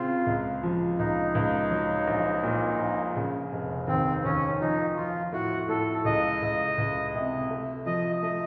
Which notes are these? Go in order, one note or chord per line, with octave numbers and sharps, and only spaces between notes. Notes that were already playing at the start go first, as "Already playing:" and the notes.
Already playing: C#3 C4 F4
C#2
F3
C#2 D#4
C#2
F#3
A#1
A#2
A#1
C#3
F1
D#2 C4
D#2 C#4
F3 D#4
F3 F4
A2 F#4
A2 A4
C#2 D#5
C#2
C#2
C3
A3
F3 D#5
A3 D#5